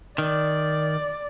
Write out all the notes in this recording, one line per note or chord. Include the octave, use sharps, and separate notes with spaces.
D#3 D5